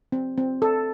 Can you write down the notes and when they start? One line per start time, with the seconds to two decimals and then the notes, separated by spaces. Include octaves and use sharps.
0.12 C4
0.38 C4
0.62 A4